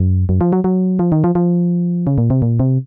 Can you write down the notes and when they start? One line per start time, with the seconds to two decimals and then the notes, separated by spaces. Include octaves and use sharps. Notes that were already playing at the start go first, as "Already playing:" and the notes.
Already playing: F#2
0.29 F#2
0.41 F3
0.53 F#3
0.64 F#3
0.99 F3
1.12 D#3
1.24 F3
1.35 F3
2.07 C#3
2.18 A#2
2.30 C3
2.42 A#2
2.60 C3